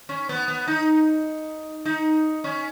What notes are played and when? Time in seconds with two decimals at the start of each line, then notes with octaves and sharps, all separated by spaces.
0.09 C#4
0.29 B3
0.48 B3
0.68 D#4
1.85 D#4
2.44 C#4